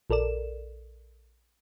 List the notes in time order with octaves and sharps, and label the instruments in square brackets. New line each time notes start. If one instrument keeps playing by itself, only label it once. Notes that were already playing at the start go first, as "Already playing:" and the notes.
[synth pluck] A#1 A4 A#4 D5 E7